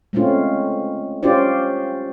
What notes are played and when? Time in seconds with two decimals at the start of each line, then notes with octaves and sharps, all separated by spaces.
0.13 G#3 A3 C4 C#4 F4
1.23 C#4 F4 G4 C5 D5